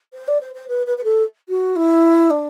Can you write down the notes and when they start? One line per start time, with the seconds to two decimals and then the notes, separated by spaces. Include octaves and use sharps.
0.13 C5
0.28 D5
0.41 C5
0.54 C5
0.68 B4
0.86 B4
0.97 B4
1.04 A4
1.49 F#4
1.76 E4
2.30 D4